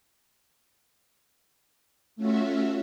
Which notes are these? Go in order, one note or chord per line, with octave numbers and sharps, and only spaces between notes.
A3 C#4 F4 F#4 E5